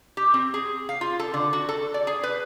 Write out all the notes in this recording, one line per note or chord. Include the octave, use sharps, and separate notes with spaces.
G4
C4
G#4
F5
F4
A4
D3
F#4
A4
D5
G#4
B4